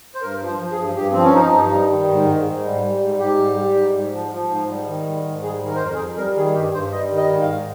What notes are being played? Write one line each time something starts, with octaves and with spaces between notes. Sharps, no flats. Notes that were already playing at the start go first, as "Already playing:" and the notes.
C5
G2 A#4
F3
C5
F3
G#4
G2
G2 G4
F3 C4
C#4
F3 D#4
G2
G3
D#3
G#2
G#2
G#2
G3
G3
G#2
G#2 G4
G3
G3
G#2
G#2
F3
F3
G#2
G3
D#3
G#2
G#2
G3 G#4
D#3
A#4
C5
F2 A#4
G#4
F2
G3 A#4
D#3 G#4
G2 G4
G2 C5
G3 D#5
D#3
D#5
G#2
F5
G#2